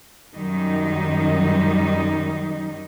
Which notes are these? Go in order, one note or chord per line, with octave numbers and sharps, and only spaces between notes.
F#2 D#3 G3 D#4